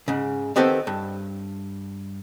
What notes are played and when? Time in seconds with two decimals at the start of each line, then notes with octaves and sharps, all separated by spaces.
0.08 G#2 C#3
0.56 D#3 B3 C4 G4 A4
0.87 G2